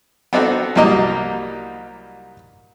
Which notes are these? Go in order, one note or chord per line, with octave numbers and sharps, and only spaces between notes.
B3 C4 D4 D#4 F#4 A4
C2 F#3 G3 A#3 D#4 D#5